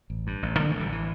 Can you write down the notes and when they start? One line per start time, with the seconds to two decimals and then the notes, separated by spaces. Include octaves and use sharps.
0.10 A1
0.27 G2
0.43 A1
0.59 D3 G3 B3
0.70 E3 A3
0.75 A1 D3 G3
0.92 E3